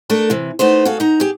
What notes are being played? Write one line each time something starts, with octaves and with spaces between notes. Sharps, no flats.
A3 D4 A4 A#4
C3 E3
A3 B3 D#4 C5
F#4 G#4 A4 F5
D#4 A#5
G4 G#4